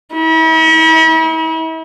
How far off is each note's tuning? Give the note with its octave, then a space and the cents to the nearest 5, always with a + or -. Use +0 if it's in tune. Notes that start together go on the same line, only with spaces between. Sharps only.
E4 -45